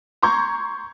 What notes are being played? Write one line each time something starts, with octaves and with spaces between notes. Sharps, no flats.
A#5 C6 C#6 G6 G#6